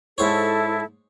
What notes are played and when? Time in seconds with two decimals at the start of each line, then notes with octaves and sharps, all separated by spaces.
0.18 G#2 E4 A4 C5 C#5